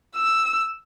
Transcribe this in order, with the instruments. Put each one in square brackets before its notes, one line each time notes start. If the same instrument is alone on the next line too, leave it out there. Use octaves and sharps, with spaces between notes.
[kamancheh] E6